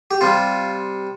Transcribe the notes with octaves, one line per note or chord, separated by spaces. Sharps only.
G4
C3 G3 F4